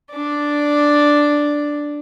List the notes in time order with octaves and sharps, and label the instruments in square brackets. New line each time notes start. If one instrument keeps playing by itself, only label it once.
[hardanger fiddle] D4 D5